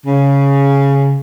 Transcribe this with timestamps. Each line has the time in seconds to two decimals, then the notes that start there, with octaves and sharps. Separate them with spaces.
0.06 C#3